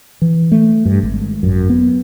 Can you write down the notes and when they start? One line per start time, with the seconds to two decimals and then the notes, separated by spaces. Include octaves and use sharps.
0.22 E3
0.52 A3
0.85 G2
1.03 G#1
1.43 F#2
1.70 B3